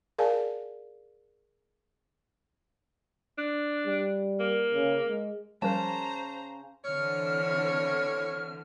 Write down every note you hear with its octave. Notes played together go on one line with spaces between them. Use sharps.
G#4 A#4 D5 F5 G#5 A5
D4
G3
A#3
C#3
G#3
C#3 F3 G3 A#4 C5 A5 A#5
D3 E3 C4 C#5 F6